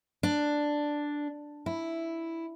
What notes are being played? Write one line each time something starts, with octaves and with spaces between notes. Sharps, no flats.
D4
E4